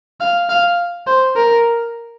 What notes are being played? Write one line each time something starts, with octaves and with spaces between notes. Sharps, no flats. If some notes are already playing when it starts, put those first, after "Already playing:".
F5
F5
C5
A#4